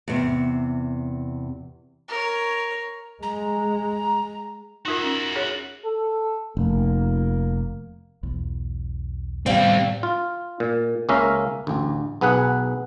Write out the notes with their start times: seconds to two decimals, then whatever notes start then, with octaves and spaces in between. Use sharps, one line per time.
0.08 E2 C3
2.08 A#4 C#5
3.23 G#3 A#5
4.86 D#4 F4 F#4 A#4 E5
5.03 C#4
5.35 G#4 C#5
5.85 A4
6.57 F1 A#3
8.23 B1 E2
9.46 E2 A2 C3 D#3 G3 C4 F5 G5
10.03 F4
10.60 A#2
11.09 C#2 A#3 C#4 E5 F5 A#5
11.67 A1 D2
12.21 B1 B3 G#4 B4 F#5